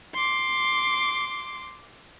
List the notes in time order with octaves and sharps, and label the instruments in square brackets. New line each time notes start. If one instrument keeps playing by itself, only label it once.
[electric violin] C6 D6